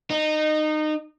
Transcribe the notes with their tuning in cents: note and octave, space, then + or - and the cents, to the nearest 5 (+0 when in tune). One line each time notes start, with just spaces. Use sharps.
D#4 -20